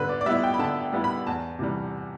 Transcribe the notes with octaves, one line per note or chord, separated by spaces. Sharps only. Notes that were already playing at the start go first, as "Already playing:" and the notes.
Already playing: D3 G3 B3 B4
D5
D5
G3 B3 E4 E5
G5
B5
D3 A5
G3 B3 E4
B5
E2 A5
C3 E3 G3